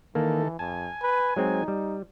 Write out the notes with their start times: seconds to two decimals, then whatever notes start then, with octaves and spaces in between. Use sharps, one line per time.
0.15 D#3 E3 A#3 A4
0.59 F2 G#5 A5
1.03 B4
1.36 F#3 G#3 C4 D#4
1.68 G3